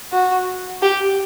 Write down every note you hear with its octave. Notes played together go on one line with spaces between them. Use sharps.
F#4
G4